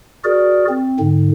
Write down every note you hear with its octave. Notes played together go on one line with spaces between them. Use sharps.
F#4 G#4 A#4 D5
C4
G#2 D3